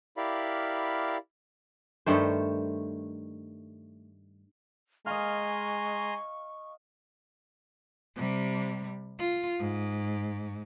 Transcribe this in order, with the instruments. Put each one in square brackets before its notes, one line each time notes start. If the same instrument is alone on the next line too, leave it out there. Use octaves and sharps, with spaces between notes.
[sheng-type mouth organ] E4 G4 A#4 D5 F5 B5
[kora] G2 D#3 A3 C5
[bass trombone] G#3 [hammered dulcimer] D#5 F5 [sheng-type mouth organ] G#5 A#5 C6 [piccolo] C#6
[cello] C3 G3
F4
G#2